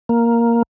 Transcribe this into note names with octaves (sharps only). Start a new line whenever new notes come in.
A#3